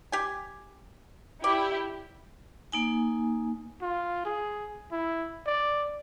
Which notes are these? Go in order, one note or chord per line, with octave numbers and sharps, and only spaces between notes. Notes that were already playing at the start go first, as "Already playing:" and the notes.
G4 G#5
E4 G4 D5
A#3 D#4 G#5
F4
G#4
E4
D5